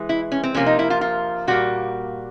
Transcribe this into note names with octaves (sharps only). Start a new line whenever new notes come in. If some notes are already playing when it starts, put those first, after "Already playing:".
Already playing: E3 G#3
E4
C#4
C4
C3 F3 A#3 C#4
D#4
E4
F4
F4
A#2 G3 A#3 F#4